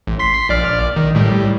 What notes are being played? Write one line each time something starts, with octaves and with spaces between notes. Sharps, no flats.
A1
C6 B6 C7
A#1 D5 F6
D#3
A2 G3